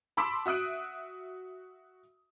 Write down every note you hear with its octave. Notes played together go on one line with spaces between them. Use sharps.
A5 B5 C6 D6 E6 B6
F#4 E5 D#6 F#6 D7